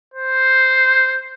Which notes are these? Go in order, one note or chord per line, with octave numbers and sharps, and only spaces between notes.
C5